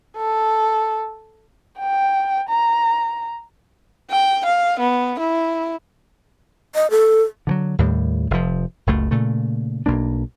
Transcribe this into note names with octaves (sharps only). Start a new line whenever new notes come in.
A4
G5
A#5
G5
F5
B3
E4
D#5
A4
D3 E3 F#3
D#2 A2 G3
F1 F3
F#1 C#2 A3
A#2 C#3 A3
B1 A#3 D4